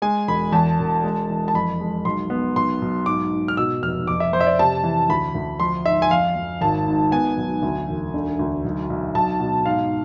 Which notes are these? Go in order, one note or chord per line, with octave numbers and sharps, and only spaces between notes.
G#3 G#5
E1 B5
E2 A5
E1
G#3
E3
A5
F2 B5
G#3
B1 C6
B3
B1 C6
B1
G#2 D6
G#2
F6
B2 E6
F1 F6
F2 D6
E5
F2 C5
E5
D5
C3 A5
E3
D2 B5
D2
F3 C6
G#2 E5
G#5
F2 F5
F2
G#1 A5
G#2
B3 G#5
B1
D2
E1
D3
D2
B1
B1
B1 A5
B2
G#2 F5